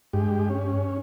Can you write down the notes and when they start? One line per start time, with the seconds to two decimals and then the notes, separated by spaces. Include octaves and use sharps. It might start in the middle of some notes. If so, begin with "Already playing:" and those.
0.13 G2 G#3 G4
0.50 C#4